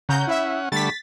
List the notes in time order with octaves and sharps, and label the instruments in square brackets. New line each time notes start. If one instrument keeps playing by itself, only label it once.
[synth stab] C#3 A#5 G6 [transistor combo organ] C#4 F#5
[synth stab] E4 E5
[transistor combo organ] D3 G3 A3 [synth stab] A6 B6